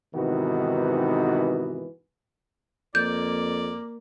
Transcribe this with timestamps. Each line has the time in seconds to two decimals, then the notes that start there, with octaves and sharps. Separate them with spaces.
0.15 G#2 C3 D#3 E3 B3 F#4
2.95 F2 A#3 D5 G6